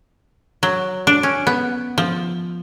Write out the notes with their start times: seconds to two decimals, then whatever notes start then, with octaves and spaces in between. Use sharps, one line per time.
0.63 F#3
1.07 D4
1.23 C#4
1.47 B3
1.98 F3